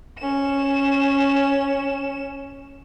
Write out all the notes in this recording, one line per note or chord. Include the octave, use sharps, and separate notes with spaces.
C#4 E7